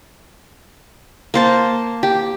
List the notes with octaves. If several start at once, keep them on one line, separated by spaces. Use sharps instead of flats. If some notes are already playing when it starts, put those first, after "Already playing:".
A#3 C5 A5
G4